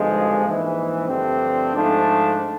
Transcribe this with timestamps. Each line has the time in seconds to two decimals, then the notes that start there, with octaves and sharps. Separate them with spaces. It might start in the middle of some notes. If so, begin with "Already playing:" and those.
Already playing: G#1 G2 D3 F3 G#3
0.43 A#1 G#2 E3
1.08 G2 D3 F3 A3 C4
1.73 G#2 F3 A3 D4